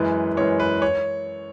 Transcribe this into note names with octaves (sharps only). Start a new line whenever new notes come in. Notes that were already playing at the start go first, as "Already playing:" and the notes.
Already playing: F#2 E3 G#3 B4
F#2 E3 G#3 C#5
B4
C#5